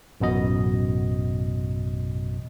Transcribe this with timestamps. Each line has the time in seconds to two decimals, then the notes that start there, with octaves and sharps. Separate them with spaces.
0.20 A1 F#2 B2 D#5